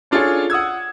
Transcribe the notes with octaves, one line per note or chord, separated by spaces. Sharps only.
C#4 D4 F4 G#4 A4 C#5
F#5 D#6 E6 G#6